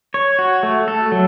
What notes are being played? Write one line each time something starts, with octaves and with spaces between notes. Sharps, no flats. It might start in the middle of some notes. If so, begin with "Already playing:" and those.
C#5
F#4
A3
A4
F#3